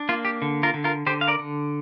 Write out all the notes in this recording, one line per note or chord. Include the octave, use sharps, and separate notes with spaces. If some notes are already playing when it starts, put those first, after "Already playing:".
Already playing: D4
A#3 F4
G4
D3
F4 A#4
D3
F4 A#4
D3 G4 C5
F5
A#4 D5
D3